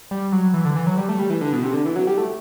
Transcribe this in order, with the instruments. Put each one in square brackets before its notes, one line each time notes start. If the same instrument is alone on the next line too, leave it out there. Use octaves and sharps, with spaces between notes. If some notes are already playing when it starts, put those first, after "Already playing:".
[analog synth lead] G3
F#3
E3
D3
E3
F#3
G3
A3
G3
E3
D3
B2
C3
D3
E3
F#3
G3
A3